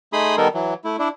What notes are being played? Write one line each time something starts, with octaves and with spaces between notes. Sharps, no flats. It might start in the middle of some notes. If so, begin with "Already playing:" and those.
A3 D#4 G#4 B5 C6 D#6
D#3 G3 B3 D#4 A4 A#4
E3 F#3
A3 E4
D4 E4